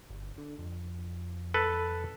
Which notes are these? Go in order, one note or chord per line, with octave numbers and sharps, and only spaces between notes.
G1
D3
F2
A4 B4